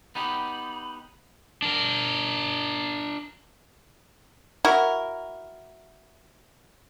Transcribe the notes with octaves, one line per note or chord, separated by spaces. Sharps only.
B3 D#4 G4 B5
D4 A#4
E4 F#4 A#4